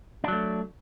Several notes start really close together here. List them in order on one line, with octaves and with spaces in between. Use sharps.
D4 F#3 A3